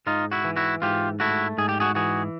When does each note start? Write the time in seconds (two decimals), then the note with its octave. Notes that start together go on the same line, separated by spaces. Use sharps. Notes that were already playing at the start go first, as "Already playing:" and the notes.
0.07 G#2 D#4 F4
0.32 E4 F#4
0.45 E3
0.56 E4 F#4
0.82 G#2 F4 G4
1.20 A3 E4 F#4
1.58 G#2 G#4
1.69 G4
1.80 F#4 G#4
1.95 E3 F#4 G#4